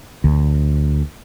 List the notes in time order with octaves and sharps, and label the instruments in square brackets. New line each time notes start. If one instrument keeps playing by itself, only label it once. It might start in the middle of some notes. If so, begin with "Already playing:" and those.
[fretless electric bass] D2